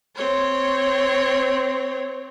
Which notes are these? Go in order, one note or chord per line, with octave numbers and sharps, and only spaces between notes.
C4 C#5